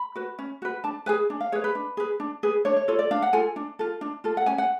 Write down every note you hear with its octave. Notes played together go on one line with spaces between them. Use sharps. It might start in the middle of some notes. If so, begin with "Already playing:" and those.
Already playing: B5
F#4 B4
C#4
F#4 B4
D4 A5
G#4 B4 G#5
D4
F5
G#4 B4 C#5
B4
D4
G#4 B4
D4
G#4 B4
D4 C#5
C#5
F4 A4 C#5
D5
D4 F5
F#5
F4 A4 G#5
D4
F4 A4
D4
F4 A4
F#5
C#4 G#5
F#5